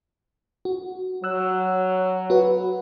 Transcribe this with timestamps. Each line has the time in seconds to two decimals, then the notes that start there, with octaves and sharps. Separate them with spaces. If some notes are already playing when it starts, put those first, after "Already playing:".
0.65 F#4
1.24 F#3 C#5 E6 F#6
2.30 F#4 B4 F#5